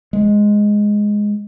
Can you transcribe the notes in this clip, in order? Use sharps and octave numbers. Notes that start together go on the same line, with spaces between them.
G#3